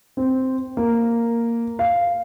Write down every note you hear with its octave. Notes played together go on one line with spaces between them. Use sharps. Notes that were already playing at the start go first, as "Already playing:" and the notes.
C4
A#3
F5